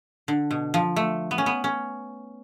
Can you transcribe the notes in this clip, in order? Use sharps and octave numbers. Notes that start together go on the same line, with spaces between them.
D3
B2
F3
A3
B3
C#4
B3
C#4